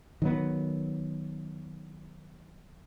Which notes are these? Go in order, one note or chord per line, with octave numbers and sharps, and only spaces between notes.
D#3 F#3 B3